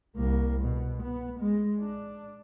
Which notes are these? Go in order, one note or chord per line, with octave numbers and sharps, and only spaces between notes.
C2 A#3
B2
B3
G#3
D4